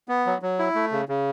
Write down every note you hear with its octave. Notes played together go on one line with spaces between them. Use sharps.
B3
F#3
F#3
E4
A3
C#3
C#3